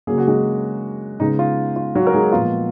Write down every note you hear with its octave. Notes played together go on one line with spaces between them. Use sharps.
C#3 F#3 A#3 G#4
F#4
G#3 G#4
C#3 G#3 B3 D#4
F4
F4
F#3 F#4
A#4
G#3 G#4
A#2 F3 G#3 B3 F4